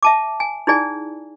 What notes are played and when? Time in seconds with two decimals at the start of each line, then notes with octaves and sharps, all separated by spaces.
0.03 E5 A5 D6
0.40 G#5
0.67 D#4 E4 G#4 D5 G#5